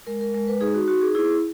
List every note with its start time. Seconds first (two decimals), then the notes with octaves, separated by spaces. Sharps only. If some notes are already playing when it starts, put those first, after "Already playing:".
0.07 G#3 A#4
0.21 A#4
0.34 G#3 A#4
0.47 B4
0.61 D#4 G#4
0.74 F#4
0.88 F#4
1.01 G#4
1.15 E4 G#4